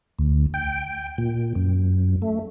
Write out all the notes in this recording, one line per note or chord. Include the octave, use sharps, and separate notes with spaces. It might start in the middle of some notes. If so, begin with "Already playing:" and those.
D2
G5
A#2
F#2
A3